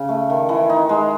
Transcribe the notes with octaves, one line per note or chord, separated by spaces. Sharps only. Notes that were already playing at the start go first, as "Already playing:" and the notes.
Already playing: C#3
A3
D#3
E3
D#4
G#3